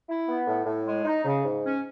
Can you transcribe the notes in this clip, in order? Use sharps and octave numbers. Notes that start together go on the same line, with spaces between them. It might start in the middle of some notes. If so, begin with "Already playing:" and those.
E4
B3
A2
A2
G#3
D#4
C#3
G#2
C#4